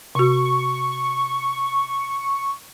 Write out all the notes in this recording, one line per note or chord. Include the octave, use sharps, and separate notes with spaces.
C3 F#4 C#6